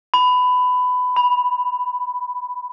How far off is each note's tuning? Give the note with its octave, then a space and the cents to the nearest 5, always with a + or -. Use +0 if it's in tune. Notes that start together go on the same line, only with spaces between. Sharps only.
B5 +15
B5 -5